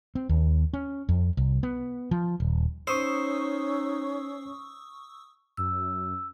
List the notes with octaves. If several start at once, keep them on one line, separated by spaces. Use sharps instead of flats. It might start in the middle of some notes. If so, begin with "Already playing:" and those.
C4
D#2
C#4
F2
C2
B3
F3
D#1
C#4 D#4 C5 C#6 D#6 E6
F#2 E6